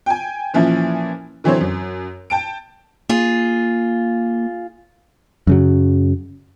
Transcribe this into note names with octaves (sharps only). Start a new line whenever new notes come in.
G5 G#5
A#2 E3 F3 C#4 E4
D3 E3 F#3 C4 C5 C#5
F#2
G5 A5 D7
A#3 F4 G#4
F#2 C#3 F#3